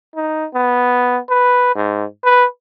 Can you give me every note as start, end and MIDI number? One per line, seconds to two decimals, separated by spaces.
0.15 0.46 63
0.54 1.18 59
1.30 1.72 71
1.75 2.05 44
2.24 2.45 71